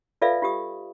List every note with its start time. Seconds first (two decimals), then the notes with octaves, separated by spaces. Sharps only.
0.22 F4 A4 B4 D5 E5 F5
0.42 F4 G4 D#6